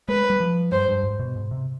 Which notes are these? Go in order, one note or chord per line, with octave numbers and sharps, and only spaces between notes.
G#3 B4
G3
F3
G2 C5
G2
G#2
B2
G#2
C3